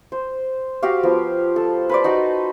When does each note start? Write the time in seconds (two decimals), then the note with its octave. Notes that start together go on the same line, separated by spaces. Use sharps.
0.12 C5
0.83 F#4 G4 F5
1.03 F3 B3
1.56 A4
1.89 B4 C5 D5
2.04 D#4 F#4